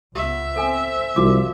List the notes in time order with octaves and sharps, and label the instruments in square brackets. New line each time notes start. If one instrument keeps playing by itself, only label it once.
[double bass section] C#2 B3 [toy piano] G4 [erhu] E5
[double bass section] C4 [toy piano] A4 G#5
[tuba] C2 [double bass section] F3 [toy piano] F#4 D6